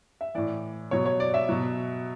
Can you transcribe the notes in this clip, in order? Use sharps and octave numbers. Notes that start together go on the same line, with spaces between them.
E5
A2 E3 D5
B2 F#3 C#5
C#5
D5
E5
B2 F#3